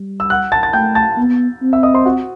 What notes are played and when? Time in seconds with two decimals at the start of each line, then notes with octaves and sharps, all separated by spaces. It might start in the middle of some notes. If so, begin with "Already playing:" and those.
Already playing: G3
0.20 E6
0.30 F#5 F#6
0.52 A5 A6
0.63 A6
0.73 A3 G5 G6
0.95 A5 A6
1.17 B3
1.62 C4
1.73 E5 E6
1.83 D#5 D#6
1.94 C5 C6
2.05 F#4 F#5